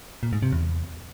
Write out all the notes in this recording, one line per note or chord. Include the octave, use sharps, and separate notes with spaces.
A#2
G#2
C3
E2